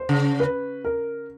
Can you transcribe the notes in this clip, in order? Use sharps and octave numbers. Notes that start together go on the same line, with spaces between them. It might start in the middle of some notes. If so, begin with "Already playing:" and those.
Already playing: C5
C#3
B4
A#4